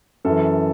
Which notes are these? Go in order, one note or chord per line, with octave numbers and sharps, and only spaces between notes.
F#2 E3 A4